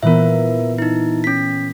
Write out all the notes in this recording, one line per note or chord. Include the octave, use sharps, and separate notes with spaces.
A#2 E3 B3 A#4 E5
D#4 E4
C#4 B6